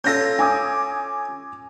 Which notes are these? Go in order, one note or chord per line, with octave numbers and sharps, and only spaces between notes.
C#4 F4 A4 G6 A#6
G#5 D6 D#6